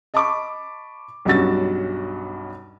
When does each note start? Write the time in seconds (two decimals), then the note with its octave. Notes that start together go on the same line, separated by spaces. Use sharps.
0.14 D#5 A5 B5 C#6 D6
1.25 B1 G2 C#4 F#4 E6 A6